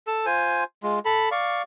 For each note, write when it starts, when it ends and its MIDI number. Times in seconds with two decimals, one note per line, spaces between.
0.07 0.26 69
0.07 0.26 88
0.26 0.64 65
0.26 0.64 72
0.26 0.64 80
0.83 0.99 56
0.83 0.99 65
1.05 1.29 69
1.05 1.29 83
1.31 1.62 74
1.31 1.62 77
1.31 1.62 85